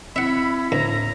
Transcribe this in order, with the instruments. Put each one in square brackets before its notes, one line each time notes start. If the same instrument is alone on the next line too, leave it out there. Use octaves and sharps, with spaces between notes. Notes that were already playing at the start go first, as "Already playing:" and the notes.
[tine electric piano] C4 [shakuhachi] E4 [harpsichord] E5 F#5 [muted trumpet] B5
[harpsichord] D2 [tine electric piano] A2 C#5 B6 [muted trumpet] A#5